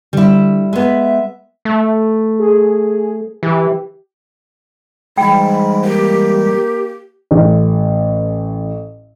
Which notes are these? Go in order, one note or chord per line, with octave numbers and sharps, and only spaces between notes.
D3 G3 E4
G#3 B3 E5
A3
G#4
E3 G4
G#2 E3 G3 G#3 G5 B5
A#3 G4
A1 A2